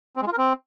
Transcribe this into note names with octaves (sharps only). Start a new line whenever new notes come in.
C4
G#3
F4
A#4
C4